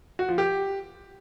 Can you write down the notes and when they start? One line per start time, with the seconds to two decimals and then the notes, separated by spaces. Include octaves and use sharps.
0.19 F#4
0.29 F3
0.38 G4